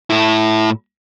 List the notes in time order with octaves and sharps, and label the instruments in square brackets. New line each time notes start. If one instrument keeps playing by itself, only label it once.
[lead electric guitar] A2 E4